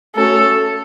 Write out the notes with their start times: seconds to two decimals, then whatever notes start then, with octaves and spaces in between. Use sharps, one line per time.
0.16 A3 C#4 F#4 A4 C#5